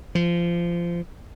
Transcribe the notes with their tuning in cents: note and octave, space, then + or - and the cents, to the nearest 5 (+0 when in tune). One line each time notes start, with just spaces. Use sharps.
F3 -20